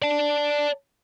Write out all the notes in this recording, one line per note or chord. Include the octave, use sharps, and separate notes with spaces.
D5 A5